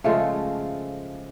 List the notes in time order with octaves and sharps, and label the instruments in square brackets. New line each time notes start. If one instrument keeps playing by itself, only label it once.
[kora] C#3 F3 G#3 A3 A4